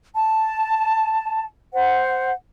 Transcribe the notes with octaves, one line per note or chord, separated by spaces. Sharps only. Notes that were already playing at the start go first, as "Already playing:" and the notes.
A5
C5 F#5